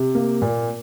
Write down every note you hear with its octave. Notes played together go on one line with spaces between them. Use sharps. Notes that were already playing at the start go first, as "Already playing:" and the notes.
Already playing: C3
A#3
A#2